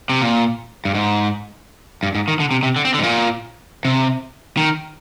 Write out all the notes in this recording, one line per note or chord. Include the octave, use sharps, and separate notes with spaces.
C3
A#2
G2
G#2
G2
G#2
D#3
D3
C3
C3
D3
C4
D3
G#2
A#2
C3
D#3